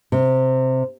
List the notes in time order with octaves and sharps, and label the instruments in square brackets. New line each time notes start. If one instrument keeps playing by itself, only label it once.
[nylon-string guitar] C3